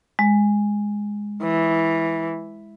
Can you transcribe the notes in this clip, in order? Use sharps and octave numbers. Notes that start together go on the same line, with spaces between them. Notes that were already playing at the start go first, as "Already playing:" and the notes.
G#3
E3